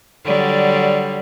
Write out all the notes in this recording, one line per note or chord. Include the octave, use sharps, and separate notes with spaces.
D3 F#3 G3